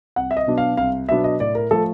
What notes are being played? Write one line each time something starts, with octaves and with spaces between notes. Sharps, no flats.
C2 F#5
E5
D#5
B2 F#3 B3 D4
F5
C2 F5
B2 F#3 B3 D4 E5
D#5
A2 D5
A#4
F3 A3 A4